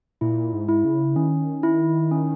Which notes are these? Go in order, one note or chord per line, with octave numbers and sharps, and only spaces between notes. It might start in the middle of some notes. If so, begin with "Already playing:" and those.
A#2 E4
G#2
E4
C#3
D#3 C#4
E4
C#4